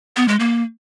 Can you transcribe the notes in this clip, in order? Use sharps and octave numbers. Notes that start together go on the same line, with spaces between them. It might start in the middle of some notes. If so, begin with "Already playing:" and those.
B3
G#3
A#3